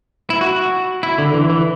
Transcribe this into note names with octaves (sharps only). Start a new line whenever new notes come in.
E4
F#4
E4
D3
E3
E3